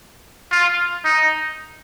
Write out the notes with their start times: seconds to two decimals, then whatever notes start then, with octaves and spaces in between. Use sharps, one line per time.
0.52 F4
1.04 D#4